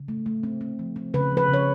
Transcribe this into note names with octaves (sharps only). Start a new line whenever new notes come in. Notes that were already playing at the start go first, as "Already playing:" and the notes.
Already playing: C#3
A3
A3
C4
C4
F3
C4
C#3 B4
F3
B4
C#3 C#5